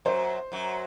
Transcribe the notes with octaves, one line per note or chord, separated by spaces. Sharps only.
F#2 F#3 C5
F#2 F#3